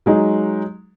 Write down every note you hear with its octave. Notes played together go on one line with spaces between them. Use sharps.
F#3 G#3 D#4